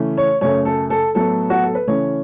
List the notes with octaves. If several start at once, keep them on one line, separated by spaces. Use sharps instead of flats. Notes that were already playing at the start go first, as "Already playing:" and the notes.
Already playing: C#3 E3 A3 C#4
C#5
F#2 C#3 A3 C#5
A4
A4
A2 F#3 B3 A4
F#4
A4
B4
C#3 E3 A3 C#4 C#5